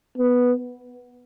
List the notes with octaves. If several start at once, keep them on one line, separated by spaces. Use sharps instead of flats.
B3